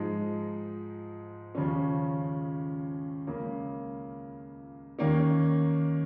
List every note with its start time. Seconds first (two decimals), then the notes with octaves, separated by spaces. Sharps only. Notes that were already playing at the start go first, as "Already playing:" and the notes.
Already playing: G#2 F3 G#3 D#4
1.55 D#2 C#3 F3 C#4
3.27 C#2 C#3 A#3
4.99 D#2 D#3 A#3 C#4